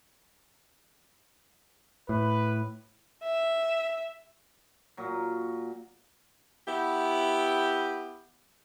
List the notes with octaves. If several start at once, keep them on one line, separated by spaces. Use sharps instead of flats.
A2 B4
E5
A#2 F#3
B3 E4 G4